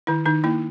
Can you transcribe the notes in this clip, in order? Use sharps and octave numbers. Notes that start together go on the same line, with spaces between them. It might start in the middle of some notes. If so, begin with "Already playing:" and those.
D#3 E4
D#3 D#4
A#3 E4